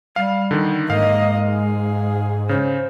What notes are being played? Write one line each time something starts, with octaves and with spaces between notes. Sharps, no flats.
G3 F5
D3 D#3
G#2 G#3 A#3 D#5 F5
G#4
C#3 C5